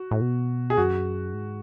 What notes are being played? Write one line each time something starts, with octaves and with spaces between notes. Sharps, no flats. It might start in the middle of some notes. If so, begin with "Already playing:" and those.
Already playing: F#4
A2
B2
G#4
F#2 F#4
G#2